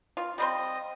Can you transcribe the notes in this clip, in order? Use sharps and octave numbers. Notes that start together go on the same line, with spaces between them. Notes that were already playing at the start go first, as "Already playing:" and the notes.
F4
G3 C4 D#5 C6